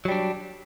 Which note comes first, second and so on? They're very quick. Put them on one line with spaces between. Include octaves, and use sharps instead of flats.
F#3 G3 D4